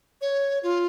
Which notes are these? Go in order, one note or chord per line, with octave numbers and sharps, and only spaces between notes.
C#5
F4